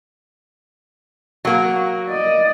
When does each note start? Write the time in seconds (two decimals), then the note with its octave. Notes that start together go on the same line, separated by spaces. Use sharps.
1.45 F#3 A#3
2.09 D5 D#5